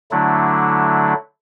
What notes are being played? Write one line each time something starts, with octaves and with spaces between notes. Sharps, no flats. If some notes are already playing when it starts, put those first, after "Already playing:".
D3 F#3 A3 D4 E4